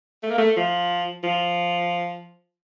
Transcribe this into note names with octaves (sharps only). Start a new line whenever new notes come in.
A3
A#3
A3
F3
F3